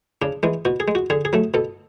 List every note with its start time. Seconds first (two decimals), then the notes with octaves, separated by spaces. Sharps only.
0.22 C#3 D4
0.43 E3 G#3
0.65 B2 F#4
0.80 G#4
0.88 G#3
0.95 F#4
1.10 D3 G#4
1.25 G#4
1.33 F#3 A3
1.54 B2 A4